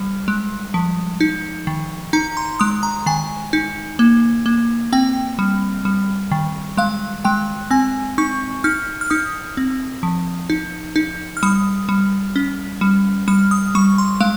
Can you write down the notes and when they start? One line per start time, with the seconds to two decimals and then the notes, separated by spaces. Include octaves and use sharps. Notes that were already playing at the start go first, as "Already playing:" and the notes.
Already playing: G3
0.28 G#3
0.74 F3
1.20 D#4
1.67 D#3
2.13 D#4 A#5
2.37 C6
2.59 G#3 D#6
2.83 A#5
3.06 D#3 G#5
3.53 D#4
3.99 A#3
4.46 A#3
4.92 C4 G5
5.39 G3
5.85 G3
6.31 D#3
6.77 G#3 F5
7.25 G#3 G5
7.71 C4 G#5
8.18 D#4 C#6
8.64 D#4 F6
9.01 F6
9.10 D#4 D#6
9.57 C4
10.03 F3
10.50 D#4
10.96 D#4
11.37 F6
11.43 G3 D#6
11.89 G3
12.36 C#4
12.81 G3
13.28 G3 F6
13.51 D#6
13.75 G3 C#6
13.98 C6
14.21 G#3 F5